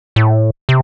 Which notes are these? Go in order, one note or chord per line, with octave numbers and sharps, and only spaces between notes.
A2
C3